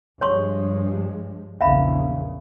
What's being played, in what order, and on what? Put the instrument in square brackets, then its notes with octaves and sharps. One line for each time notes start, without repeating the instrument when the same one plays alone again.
[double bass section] G2 F3 G#3 [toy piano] C#5 C6 C#6
[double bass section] A#1 E2 C#3 [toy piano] E5 F5 B5